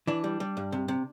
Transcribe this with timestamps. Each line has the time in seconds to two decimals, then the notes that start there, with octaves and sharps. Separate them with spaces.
0.07 E3 D4
0.24 G3
0.40 G3
0.57 G2
0.72 C3
0.88 C3